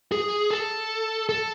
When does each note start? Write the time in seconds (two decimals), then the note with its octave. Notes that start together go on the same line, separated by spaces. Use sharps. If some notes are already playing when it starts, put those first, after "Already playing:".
0.12 G#4
0.50 A4
1.29 A4